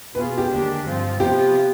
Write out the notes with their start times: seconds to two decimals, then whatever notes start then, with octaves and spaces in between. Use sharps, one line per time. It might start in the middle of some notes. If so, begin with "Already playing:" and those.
0.14 B2 B3 F4 G#4 B4
0.38 G4
0.50 D#2 D3 G#3 D4 G4
0.85 G2 F3 C4 F4
1.20 C3 F3 B3 F4 G4